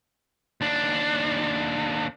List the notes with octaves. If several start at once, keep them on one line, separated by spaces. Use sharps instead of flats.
D#2 D4